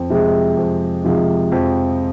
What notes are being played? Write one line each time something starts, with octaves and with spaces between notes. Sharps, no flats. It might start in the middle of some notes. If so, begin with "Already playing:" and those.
Already playing: F2
C3 F3 G#3
F2
C3 F3 G#3
F2